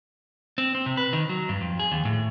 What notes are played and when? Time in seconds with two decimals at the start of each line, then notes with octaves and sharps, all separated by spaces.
0.58 C4
0.75 C4
0.86 C3
0.97 B4
1.13 D#3
1.29 F#3
1.49 G2
1.61 F2
1.79 G#4
1.92 D#2
2.05 A2